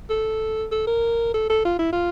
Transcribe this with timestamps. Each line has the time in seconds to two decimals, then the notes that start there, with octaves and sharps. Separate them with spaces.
0.09 A4
0.72 A4
0.87 A#4
1.34 A4
1.49 A4
1.65 F4
1.79 E4
1.92 F4